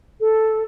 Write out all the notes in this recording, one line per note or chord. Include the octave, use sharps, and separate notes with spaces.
A4